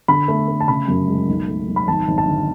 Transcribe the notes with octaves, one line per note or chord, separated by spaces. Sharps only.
D3 B5
A3
A3
A5
C#3 B5
F#2
G#3
B1
A3
B1
B5
G#1 A5
G#1
A5
D3